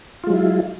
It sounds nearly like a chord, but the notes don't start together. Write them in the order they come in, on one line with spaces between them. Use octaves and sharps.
F4 G#3 F#3 E4